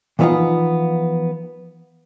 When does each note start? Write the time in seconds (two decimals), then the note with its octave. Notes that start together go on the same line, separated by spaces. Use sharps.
0.19 E3 F3 A3 B3 D#4 F4